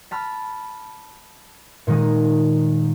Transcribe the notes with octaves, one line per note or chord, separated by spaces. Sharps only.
A5 B5 F6
A#2 D#3 G#3 A#3 D#6